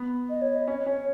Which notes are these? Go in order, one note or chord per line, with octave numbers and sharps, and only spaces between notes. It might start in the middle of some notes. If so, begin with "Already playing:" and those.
Already playing: B3
D#5
C#5
D#5
C#4 C#5
C#4 C#5